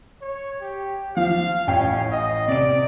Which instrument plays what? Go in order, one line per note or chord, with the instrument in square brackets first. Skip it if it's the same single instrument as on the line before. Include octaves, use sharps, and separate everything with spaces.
[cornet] C#5
G4
[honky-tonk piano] F3 [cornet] F5
[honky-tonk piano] A1 G5 C7 [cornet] C#4
[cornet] D#5
[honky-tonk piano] C3 D7 [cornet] D5